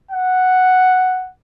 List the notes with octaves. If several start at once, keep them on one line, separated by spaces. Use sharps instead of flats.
F#5